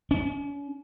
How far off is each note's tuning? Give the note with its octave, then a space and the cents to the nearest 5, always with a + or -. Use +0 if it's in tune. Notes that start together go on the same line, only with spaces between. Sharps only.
C#4 +40